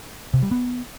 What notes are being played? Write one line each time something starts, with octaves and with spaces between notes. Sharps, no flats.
C3
G3
B3